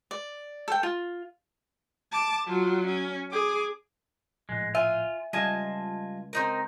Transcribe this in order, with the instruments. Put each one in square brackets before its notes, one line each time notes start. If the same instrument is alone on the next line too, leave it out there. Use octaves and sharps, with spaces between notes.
[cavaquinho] D5
A4 G5
F4
[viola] A5 D6
F#3 F4
C#4
G#4 D6
[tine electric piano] A#1 A2 F#6 [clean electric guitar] G#3
[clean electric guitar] F4 [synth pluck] E5 [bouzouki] G#5
[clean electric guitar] C#2 G#5 [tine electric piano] G3 [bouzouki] F4 D#5 A5
[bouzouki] C4 D#4 A#4